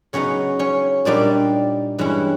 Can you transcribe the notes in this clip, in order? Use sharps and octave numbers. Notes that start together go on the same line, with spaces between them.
C#3 F#3 B3 C#4 D#4 C#5
C#4 C#5
A#2 G3 A#3 D4 D#4 D5
G2 E3 G#3 C#4 E4